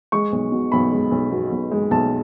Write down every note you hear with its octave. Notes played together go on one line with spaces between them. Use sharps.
G#3 C#6
B1
B2
B1 B5
G#3
B1
B2
B1
G#3
B1 A5